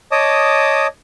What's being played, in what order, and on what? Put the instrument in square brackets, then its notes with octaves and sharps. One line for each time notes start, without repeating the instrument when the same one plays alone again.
[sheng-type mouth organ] C#5 D#5 A5 D6 D#6